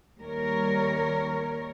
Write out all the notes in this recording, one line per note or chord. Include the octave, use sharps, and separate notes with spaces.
D#2 G3 A#4 C#5